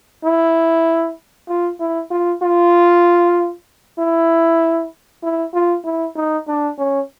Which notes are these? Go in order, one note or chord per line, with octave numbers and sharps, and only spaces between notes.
E4
F4
E4
F4
F4
E4
E4
F4
E4
D#4
D4
C#4